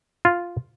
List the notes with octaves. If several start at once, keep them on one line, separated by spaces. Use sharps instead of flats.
F4